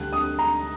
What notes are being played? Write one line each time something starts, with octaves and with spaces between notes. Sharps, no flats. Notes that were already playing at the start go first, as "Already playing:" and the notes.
Already playing: D2 D3 G3 F#6
D#6
A#5